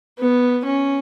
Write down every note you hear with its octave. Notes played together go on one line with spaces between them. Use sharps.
B3
C#4